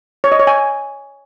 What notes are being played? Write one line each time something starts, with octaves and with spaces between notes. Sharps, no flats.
C#5
D#5
C#5
G#5